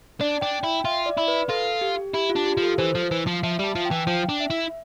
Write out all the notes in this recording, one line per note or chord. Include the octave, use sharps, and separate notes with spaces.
D4 D5
D4 G5
E4 G5
F4 E5
D5
E4
B4
F4 A4
G4
E4 G4
F4
D4
G4
F3
A4
E3 C5
F3
E3
F3
F3 E5
G3 A5
F3
G5
E3
F3 G5
D4
E5
E4